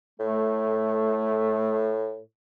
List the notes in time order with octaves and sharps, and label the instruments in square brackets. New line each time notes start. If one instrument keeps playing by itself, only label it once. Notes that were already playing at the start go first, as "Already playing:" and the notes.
[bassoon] A2 [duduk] A3